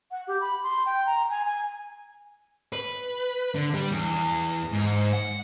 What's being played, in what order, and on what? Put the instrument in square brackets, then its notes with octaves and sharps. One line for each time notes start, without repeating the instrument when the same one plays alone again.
[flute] F#5
G4
B5
C6
G5
A#5
G#5
G#5
[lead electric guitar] B4
D3
G3
E2
G#2
F#5